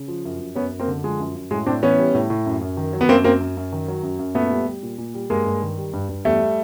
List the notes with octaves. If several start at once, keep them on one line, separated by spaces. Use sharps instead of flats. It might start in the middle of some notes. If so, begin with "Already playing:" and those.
Already playing: C#3
F3
F#2
F#2
F#2 B3 C#4
F#2
A#3 C4
D3
F3 G#3
F#2
F#2
A2 G#3
A2 C4 D4
E3 B3 C#4
G3
A2
A2
F#2
F#2
D#3
F#3
B3
F#2 A#3 C4
F#2 A#3 C4
F#2
F#2
D#3
F#3
F#2
F#2
A#2 A3 B3
G3
G3
A#2
A#2
G3
G2 G#3 A#3
G2
D#3
G3
G2
G2
E2 G3 A3